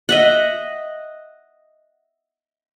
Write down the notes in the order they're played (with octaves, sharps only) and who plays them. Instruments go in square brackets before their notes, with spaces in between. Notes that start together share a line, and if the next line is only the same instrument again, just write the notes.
[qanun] D#5 E5 F#5